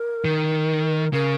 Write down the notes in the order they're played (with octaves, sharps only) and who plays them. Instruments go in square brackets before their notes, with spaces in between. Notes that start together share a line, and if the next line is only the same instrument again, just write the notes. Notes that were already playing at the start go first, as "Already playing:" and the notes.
Already playing: [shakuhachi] A#4
[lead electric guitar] D#3
[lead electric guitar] C#3 [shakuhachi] A#4